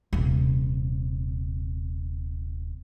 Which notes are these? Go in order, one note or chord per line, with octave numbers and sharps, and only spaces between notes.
D#1 C3